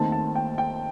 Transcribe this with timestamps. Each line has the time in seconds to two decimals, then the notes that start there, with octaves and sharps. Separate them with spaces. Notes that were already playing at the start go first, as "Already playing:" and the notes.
Already playing: D#2 D#3 A3 C4 A5
0.12 A5
0.35 G5
0.58 G5